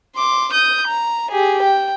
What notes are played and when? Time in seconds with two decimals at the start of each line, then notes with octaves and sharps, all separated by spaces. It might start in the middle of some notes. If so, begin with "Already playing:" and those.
0.16 C6 D6
0.52 D#6 G6
0.87 A#5
1.31 G4 G#4
1.62 G5